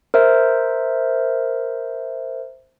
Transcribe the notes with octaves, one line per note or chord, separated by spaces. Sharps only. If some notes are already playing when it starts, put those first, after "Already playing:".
A#4 C5 E5